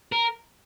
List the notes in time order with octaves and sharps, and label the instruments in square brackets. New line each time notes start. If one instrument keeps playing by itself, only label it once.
[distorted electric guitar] A#4